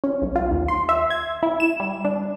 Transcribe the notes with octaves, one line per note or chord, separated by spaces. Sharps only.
C#4
B1
F4
D#2
C6
E5
G#6
E4
E7
G3
D4